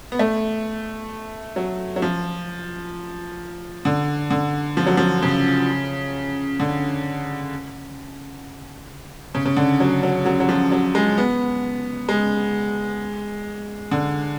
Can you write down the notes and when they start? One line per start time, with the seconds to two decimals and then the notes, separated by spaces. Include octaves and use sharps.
0.12 B3
0.19 A3
1.56 F#3
1.96 F#3
2.02 F3
3.85 D3
4.31 D3
4.77 F3
4.86 F#3
4.97 F3
5.22 C#3
6.60 D3
9.35 C#3
9.45 C#3
9.57 D3
9.80 F#3
10.03 F#3
10.26 F#3
10.40 F#3
10.49 F3
10.72 F#3
10.95 G#3
11.18 B3
12.09 G#3
13.91 D3